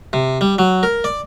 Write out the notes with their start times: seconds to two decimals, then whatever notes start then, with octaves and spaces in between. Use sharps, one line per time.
0.13 C3
0.41 G3
0.59 F#3
0.83 A#4
1.04 D5